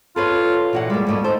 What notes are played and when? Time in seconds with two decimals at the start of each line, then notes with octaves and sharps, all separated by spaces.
0.16 F4 A4 B4 C#5
0.73 A#2 E3 F#4 F#5
0.90 G3 G#3 A#3
1.07 D#2 A2 G3 B3
1.24 D#4 A4 C5